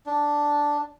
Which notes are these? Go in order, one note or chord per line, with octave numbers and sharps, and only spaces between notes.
D4